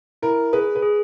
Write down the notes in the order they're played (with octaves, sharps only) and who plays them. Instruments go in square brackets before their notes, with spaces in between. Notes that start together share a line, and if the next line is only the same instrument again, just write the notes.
[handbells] E4 [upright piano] A#4
[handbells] G#4 [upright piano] B4
[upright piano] B4
[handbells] G#4